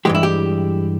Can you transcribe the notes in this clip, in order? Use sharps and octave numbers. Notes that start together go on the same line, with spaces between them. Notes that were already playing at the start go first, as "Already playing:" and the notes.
G2 E3 G#3 G4
E4
G4